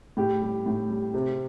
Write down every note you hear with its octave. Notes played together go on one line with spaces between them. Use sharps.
A2 G4
G3
A2
G3
C3